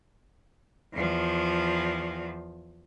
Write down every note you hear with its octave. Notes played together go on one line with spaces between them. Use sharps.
E2 F3